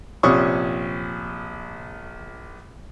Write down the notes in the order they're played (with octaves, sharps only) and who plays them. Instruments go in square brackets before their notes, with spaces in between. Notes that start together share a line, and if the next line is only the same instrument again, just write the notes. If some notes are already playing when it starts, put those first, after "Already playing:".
[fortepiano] A#1 C3 F3 C#4 C#6 D#6